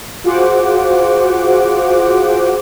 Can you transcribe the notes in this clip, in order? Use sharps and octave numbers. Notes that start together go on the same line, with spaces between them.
F4 F#4 G#4 C5 F#5 D6